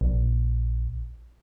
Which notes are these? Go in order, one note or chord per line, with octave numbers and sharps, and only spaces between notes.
A#1